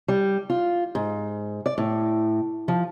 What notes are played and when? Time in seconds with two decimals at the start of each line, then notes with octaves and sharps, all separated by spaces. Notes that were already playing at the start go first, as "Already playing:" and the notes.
0.08 G3
0.50 F4
0.95 G#2
1.66 D5
1.78 A2
2.68 F3